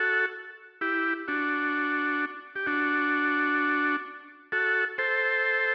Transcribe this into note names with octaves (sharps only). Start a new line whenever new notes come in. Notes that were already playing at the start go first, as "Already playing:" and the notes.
Already playing: F#4 A4
E4 G4
D4 F#4
G4
D4 F#4
F#4 A4
A4 C5